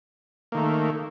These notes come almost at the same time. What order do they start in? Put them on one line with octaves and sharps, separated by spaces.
A#3 D#3 A3